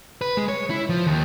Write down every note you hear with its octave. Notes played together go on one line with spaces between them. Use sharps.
B4
G#3
C#5
E4
F3
D#2